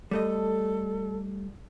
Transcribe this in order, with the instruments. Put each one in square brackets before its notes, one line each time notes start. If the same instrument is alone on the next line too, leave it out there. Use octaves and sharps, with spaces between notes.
[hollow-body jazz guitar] G3 A3 D#5 [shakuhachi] A4